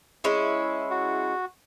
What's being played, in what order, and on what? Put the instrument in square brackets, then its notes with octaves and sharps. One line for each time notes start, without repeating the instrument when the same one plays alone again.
[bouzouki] G#3 C#4 E4
[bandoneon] F#4